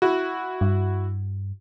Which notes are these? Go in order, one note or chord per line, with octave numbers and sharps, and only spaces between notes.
E4 F#4
G2